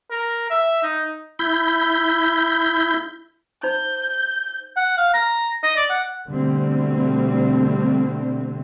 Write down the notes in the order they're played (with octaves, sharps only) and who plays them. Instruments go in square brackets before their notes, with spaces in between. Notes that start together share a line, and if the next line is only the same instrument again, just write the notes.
[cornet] A#4
E5
D#4
[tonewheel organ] E4 G6
[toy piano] D#4 C5 B5 [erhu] G6
[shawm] F#5
F5
A#5
D#5
D5
F#5
[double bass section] B2 D3 G3 A3 C4